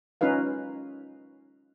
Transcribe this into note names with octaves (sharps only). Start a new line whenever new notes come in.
C#4 D#4 F4 B4 F5